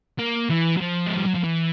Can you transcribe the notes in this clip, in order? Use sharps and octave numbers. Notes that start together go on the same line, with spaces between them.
A#3
E3
F#3
F3
G#3
G3
F#3
F3
E3